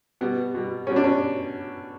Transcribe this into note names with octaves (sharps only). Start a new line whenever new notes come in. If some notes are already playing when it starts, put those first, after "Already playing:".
B2 G3 B3
B2 G3
B2 G3 C#4
D4
C#4